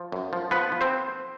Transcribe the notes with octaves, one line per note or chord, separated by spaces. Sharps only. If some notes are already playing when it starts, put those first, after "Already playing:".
Already playing: F3
F#2
F3
F3 B3 B4
F3
C4 C5